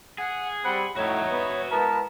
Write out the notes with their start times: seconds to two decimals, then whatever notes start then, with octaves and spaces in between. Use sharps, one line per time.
0.18 G#4 F#5
0.64 G3 C4 F#5 B5
0.96 A2 D#4 F#4 C#5 E5
1.31 B3
1.71 G#3 B3 E4 A#4 A5